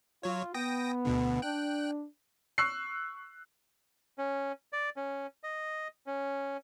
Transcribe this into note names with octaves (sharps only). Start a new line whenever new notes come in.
F#3 F4 C#5
B3 G5 D#6 A#6
D2 B2 D3
D4 G5 F#6
C#6 E6 F#6 C7
C#4
D5
C#4
D#5
C#4